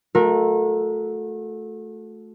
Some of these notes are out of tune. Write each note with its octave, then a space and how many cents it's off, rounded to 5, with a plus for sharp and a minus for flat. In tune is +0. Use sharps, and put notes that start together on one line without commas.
A3 -10 F#4 -40 A#4 +0